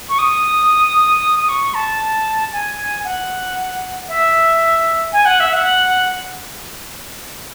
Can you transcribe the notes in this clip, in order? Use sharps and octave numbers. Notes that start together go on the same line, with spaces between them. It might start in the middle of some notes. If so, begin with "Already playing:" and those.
C#6
D#6
D#6
C#6
A5
G#5
F#5
E5
G#5
F#5
E5
F#5